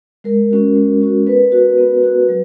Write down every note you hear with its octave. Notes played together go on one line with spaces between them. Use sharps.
G#3 A#4
C#4 F#4
G#3
C#4 F#4
B3 B4
F#4
B3
F#4
F#3